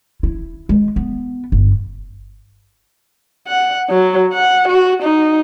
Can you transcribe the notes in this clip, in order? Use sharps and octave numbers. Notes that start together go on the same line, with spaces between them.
E4
G#3
B3
G1
F#5
F#3
F#5
F#4
D#4